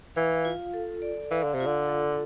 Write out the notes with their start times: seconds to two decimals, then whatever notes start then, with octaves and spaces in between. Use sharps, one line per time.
0.16 E3 F5
0.45 F4
0.74 A4
1.02 D5
1.31 E3 F5
1.43 D3
1.54 C3
1.60 F4
1.66 D3
1.89 A4